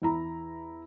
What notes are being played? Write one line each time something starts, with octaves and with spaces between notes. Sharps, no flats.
E2 E4 A#5